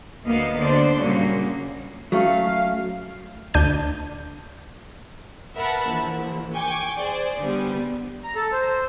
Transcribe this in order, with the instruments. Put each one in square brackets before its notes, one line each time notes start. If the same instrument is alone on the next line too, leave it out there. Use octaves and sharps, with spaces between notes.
[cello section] D2 A#3 B3 D#5 F5
D3 D4 C5 D5
A#2 C#3 F#3 G3 A#3
[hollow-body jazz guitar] F#3 A3 C#4 [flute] F5
[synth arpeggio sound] D2 D4 G6 D#7
[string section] A#4 B4 E5 F#5 A5 B5
A#1 E3
G5 G#5 C#6 D6
G#4 C5 D5
D3 G3 B3
[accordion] A#5
A4
C5